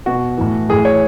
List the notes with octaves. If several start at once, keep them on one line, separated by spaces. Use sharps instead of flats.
B2 F#4
A2 E3
A2 E3 G#4
C#5